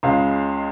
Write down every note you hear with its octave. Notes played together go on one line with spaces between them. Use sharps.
C#2 C#3 G#3 F5